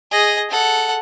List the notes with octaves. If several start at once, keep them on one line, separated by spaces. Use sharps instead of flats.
G#4 D#5
A4 F#5